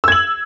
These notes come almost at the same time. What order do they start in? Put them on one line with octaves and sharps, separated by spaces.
E6 G#6 F#7